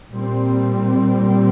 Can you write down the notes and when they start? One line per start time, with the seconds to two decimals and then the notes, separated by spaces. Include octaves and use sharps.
0.10 A#2 G3 C4